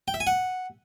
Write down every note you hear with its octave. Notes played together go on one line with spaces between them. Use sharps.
G5
E5
G#5
F#5